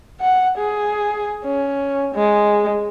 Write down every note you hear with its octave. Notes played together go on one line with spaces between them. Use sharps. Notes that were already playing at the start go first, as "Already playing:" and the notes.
F#5
G#4
C#4
G#3